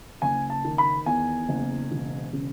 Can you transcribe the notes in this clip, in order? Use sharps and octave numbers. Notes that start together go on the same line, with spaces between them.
F#1 G#5
A5
D#3
B5
E2 G#5
F#1
E1
C#3